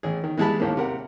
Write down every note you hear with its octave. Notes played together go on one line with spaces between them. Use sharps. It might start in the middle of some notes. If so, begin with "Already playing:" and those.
A1 G#4
D#3
E3 G3 G#3 G#4 A5 B5
D#2 A2 A#3
C3 A#4 F#5